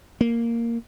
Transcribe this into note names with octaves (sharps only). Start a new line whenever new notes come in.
A#3